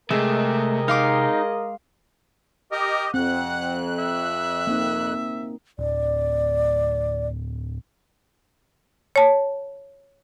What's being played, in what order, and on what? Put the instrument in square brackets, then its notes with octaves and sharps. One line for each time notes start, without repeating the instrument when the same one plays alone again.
[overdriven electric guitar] C3 [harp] G#3 [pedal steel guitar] A3 [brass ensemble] G#4 A#4 D#5
[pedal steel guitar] D#4 [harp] F5 C6 D6
[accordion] G4 D#5 [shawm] A#4
[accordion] F2 F#6 [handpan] C4 [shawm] F#5
[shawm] E5
[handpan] A#3 C4 D#4
[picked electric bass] D1 [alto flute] D5
[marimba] C#5 A5